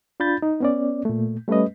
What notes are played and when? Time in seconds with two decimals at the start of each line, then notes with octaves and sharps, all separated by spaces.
0.20 D4 F4 B5 G6 A6
0.42 D#4
0.60 B3 C#4 D5
1.05 A#2 A3
1.48 G3 A3 C#4 B4 D#5